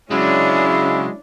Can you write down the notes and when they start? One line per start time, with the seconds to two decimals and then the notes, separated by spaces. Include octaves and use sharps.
0.11 C#3 F#3 G#3 C#4 D4 E4